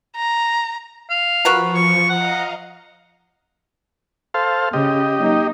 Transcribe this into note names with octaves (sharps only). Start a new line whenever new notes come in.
A#5
F5
F3 F#4 A#4 B4
C#6
D#5 F5 F#5 A#5
A4 C5 F5
C#3 G4 D#5
F#3 A#3 D#4